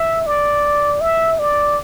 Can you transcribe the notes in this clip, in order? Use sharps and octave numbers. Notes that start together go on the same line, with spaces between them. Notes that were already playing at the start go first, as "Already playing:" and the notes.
Already playing: E5
D5
E5
D5